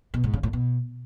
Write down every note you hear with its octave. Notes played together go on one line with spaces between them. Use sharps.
B2
G#2
C#3
A2
B2